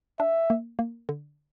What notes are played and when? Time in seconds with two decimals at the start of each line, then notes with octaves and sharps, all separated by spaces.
0.19 D4 E5
0.50 A#3
0.79 A#3
1.09 D3